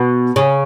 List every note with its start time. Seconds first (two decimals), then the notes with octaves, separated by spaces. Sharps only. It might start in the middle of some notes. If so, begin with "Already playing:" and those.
Already playing: B2
0.36 C#3